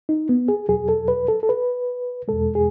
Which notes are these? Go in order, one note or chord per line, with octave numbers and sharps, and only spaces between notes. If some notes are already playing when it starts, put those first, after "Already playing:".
D#4
B3
G#4
E2 B2 F#3 G#4
A4
B4
A4
A4
B4
E2 B2 G#3 A4
G#4